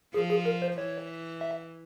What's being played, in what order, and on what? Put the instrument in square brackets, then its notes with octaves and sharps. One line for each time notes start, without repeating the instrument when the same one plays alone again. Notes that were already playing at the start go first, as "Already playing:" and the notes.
[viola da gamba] F3 [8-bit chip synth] G#4
[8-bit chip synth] G#4
A#4
C5
[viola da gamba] E3 [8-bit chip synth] C#5
[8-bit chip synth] E5